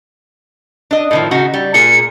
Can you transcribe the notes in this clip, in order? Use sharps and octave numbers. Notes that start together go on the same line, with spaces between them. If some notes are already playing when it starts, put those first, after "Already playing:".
D4 D#5
A2 D#3 F3
C#3 D#4 F#4
G3
A#2 A#3 G#4 C#7